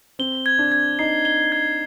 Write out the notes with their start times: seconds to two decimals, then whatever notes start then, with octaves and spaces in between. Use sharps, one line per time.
0.19 C4 G7
0.46 G#6
0.59 D4
0.72 G#6
0.99 D#4 C7
1.25 G7
1.52 G#6